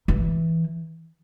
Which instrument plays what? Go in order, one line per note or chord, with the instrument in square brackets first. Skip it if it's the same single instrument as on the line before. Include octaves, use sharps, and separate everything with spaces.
[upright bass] E3